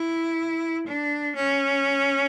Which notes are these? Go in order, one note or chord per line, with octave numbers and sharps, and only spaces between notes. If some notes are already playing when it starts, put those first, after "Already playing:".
Already playing: E4
D4
C#4